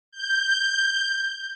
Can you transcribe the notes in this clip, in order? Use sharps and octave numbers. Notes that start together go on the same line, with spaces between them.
G6